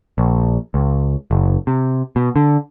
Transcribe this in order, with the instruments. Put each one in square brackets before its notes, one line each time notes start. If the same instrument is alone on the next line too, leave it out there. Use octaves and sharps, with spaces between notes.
[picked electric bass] A#1
C#2
F#1
C3
B2
D3